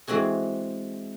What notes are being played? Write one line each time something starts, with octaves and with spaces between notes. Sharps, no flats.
E3 G#3 C4 F#4 G#4